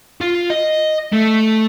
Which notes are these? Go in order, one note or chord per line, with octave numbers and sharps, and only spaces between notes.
F4
D#5
A3